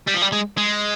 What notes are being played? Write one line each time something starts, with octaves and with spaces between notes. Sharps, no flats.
G3
F3
G3
G#3
G#3